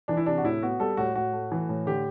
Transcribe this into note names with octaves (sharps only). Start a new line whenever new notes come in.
E3 D4
E4
C3 D4
F#4
A2 E4
B3 F#4
G3 A4
A2 F#4
A2 F#4
A3
E3
A2
D3 G4